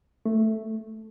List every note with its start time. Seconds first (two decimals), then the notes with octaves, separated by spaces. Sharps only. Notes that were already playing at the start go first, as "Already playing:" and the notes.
0.25 A3